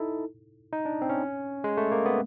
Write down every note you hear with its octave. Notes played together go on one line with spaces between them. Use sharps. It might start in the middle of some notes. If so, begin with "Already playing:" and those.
Already playing: D#4 E4 A4
D#4
D4
C4
C#4
G#3
A3
A#3
B3